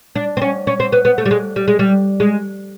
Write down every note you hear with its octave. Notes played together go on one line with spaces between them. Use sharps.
D4
C4
C#4
C#4
C4
B3
B3
A3
G3
G#3
G3
G#3
G3
G#3